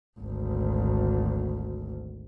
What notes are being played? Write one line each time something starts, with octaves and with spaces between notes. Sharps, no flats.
G#1 D2